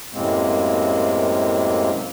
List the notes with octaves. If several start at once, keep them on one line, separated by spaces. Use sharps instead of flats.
F#2 A2 C3 G#3 A#3 C4